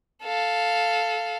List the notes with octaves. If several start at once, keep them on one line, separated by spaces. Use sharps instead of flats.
A4 F5